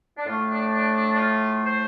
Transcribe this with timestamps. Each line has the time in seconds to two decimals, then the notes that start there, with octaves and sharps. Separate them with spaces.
0.17 D4
0.26 A2 A3 F4
0.49 D4
0.73 D4
0.95 D4
1.13 D4
1.18 F4
1.65 C5